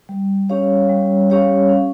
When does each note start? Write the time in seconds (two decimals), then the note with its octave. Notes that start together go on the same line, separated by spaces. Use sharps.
0.09 G3
0.50 C#4 G4 C#5 F5
0.89 G3
1.30 C#4 G4 C#5 F5
1.69 C#4